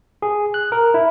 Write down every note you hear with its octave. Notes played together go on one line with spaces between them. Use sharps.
G#4
F#6
A#4
E4